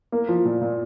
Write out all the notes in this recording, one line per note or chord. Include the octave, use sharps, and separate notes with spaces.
A#3
F3
A#2
A#2